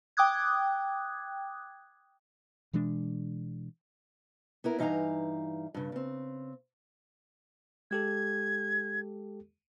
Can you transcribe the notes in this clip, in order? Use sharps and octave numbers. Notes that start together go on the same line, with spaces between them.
G5 D6 D#6 F#6 G#6
B2 E3 G#3 D4
B3 E4 A#4
G2 E3 D#4 F5 G#5 A#5
G2 C#3
C#3 C4
G#3 G4 A4 G#6